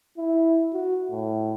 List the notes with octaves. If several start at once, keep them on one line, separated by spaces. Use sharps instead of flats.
E4
F#4
A2